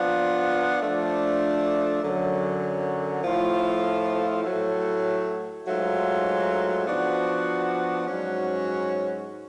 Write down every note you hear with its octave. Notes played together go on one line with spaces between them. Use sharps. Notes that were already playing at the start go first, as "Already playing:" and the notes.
Already playing: F3 B3 D4 F4
F3 A3 D4
F#2 D3 F#3
A2 F3 A3 F4
A2 F#3 A3
G#2 F#3 A3 F4
F3 B3 D4 F#4
G#2 F#3 C#4 F#4